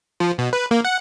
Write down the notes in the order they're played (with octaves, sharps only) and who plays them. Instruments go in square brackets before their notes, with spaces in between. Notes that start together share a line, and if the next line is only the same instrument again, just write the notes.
[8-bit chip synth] F3
B2
B4
A#3
F#5